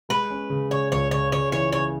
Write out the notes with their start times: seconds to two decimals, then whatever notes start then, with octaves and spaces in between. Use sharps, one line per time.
0.09 G#3 B4
0.31 C#4
0.50 C#3
0.71 C#3 C#5
0.92 C#2 C#5
1.11 C#3 C#5
1.32 C#3 C#5
1.52 E3 C#5
1.72 C#3 C#5